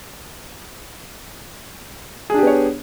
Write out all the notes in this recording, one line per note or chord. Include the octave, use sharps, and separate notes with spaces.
B3 D4 G4 G#4 C#5